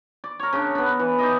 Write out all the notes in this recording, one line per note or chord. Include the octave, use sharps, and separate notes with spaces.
D5
A#4 C#5
C#3 D4
B3 D4
E3
D#4 D5 D#5